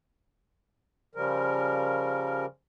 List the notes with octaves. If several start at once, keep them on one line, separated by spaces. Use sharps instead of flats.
C#3 F3 G3 A#4